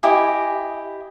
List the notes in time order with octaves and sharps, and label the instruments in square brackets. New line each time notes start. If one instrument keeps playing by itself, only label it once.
[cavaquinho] E4 G4 D#5 G#5